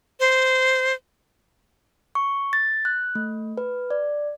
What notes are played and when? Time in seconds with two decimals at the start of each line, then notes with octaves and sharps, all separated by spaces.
0.20 C5
2.15 C#6
2.53 A6
2.85 F#6
3.15 A3
3.57 B4
3.91 D5